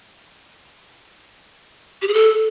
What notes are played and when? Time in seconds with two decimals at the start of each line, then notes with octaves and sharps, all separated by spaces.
2.02 G4
2.08 G#4
2.14 A4